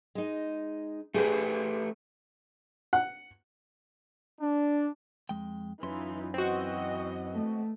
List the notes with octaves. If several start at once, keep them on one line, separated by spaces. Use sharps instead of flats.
G#3 D#4
A3 G4 G#4 B4 C5
F#5
D4
F2 G#3 G5
F#2 E3 C#4 D#4 F4 C6
E3 C4 F#4 D#5
A3